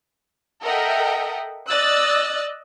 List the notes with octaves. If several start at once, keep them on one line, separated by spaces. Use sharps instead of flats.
A4 A#4 D#5 E5 F#5 G5
D5 D#5 E6 F#6 A6